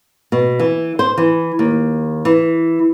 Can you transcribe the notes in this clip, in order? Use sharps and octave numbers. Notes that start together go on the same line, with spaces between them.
B2
E3
C5
E3
D#2
E3